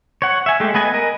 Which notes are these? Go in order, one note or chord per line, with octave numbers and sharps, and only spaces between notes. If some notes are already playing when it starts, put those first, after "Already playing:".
C#5 F#5
E5 G#5
G#3 A3 G4
B3 B4 D#5 G#5
A#4 D#5